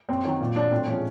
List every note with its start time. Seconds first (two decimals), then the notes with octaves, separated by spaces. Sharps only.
0.09 F#2 C4
0.25 D#3 F#3
0.41 A#2
0.56 F#3 D4
0.71 A2 C4
0.87 F3 G#3 C#4